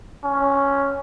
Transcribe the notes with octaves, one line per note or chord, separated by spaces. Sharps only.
C#4